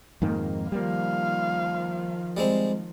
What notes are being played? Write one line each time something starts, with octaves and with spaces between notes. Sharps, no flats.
F2 G#2 D#3 A#3
D#3 F3 G3 A#3 F5
G3 G#3 C4